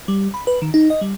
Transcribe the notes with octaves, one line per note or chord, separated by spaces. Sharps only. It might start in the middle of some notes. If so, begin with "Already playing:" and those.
G3
B5
B4
D#3
D#4
D#5
G3